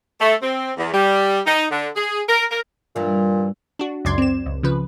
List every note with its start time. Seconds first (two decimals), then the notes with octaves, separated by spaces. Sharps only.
0.19 A3
0.41 C4
0.76 E2
0.92 G3
1.45 D#4
1.71 D3
1.95 G#4
2.27 A#4
2.49 A#4
2.96 G2 A#2 E3
3.79 D4 F#4
4.05 C#2 F#2 D5 C6 G#6
4.18 C4 E7
4.46 C#2
4.63 C#3 F3 B4